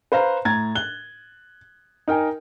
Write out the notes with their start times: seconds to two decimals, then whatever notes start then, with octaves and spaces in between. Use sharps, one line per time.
0.12 B4 C5 F5 A#5
0.45 A2 A#5 G#6 A6
0.75 F#6 G7
2.08 D#4 A#4 G5 G#5